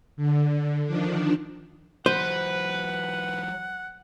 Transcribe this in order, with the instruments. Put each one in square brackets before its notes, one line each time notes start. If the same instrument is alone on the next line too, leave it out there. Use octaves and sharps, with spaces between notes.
[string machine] D3
D#3 F3 D4
[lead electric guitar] E3 F#3 [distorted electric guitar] B4 [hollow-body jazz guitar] C5 [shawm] F#5